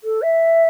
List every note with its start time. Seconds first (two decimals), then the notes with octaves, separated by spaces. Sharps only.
0.03 A4
0.22 E5